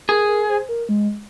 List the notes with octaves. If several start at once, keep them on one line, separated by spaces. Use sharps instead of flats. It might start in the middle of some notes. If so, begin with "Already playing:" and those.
G#4 A#4
A#4
C5
A#4
G#3